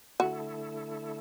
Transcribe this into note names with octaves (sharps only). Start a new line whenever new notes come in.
D3 A3 E4 F#4 A4